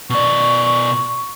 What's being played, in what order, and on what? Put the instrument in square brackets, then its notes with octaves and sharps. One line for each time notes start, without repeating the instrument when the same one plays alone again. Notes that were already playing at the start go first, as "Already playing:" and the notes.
[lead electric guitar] B2 D5 [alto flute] C#6